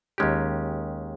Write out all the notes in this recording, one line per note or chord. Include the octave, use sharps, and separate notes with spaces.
D#2 D#3 G#3 C#4 G4